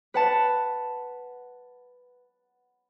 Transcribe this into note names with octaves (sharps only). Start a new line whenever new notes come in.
B4 F#5 A5